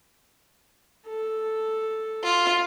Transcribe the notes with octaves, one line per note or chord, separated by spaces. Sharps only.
A4
F4